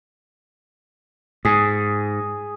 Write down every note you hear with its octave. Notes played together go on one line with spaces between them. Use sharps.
G#2 G#4